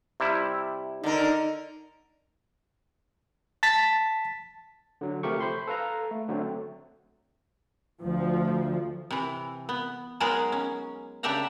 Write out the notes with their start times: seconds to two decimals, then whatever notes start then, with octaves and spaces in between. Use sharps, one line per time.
0.20 C3 G3 E4
1.04 D3 D#4 A#4
3.63 A5 A6 B6
5.01 D3 F#3
5.23 C3 F3 A3 G4 A#4 C#6
5.40 C5 B5 C6
5.67 A4 B4 F5 A#5
6.11 A3
6.29 D3 F#3 A3 C4
8.00 D2 F3
9.11 C3 E3
9.69 B3
10.20 F#3 G#3 B3 D#4 G#4 A#4
10.52 C#4
11.23 C#3 D4 G4 E5 F#5 A#5